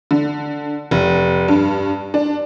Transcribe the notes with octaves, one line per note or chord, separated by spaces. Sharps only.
D3
F1
G2
D4